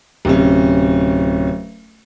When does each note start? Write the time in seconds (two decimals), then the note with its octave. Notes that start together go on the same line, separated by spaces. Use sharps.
0.25 D1 C3 C#4